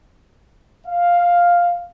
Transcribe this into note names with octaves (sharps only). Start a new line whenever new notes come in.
F5